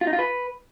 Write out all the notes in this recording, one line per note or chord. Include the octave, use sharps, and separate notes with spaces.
F4
D#4
F4
B4